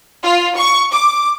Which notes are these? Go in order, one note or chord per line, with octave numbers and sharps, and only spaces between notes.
F4
C#6
D6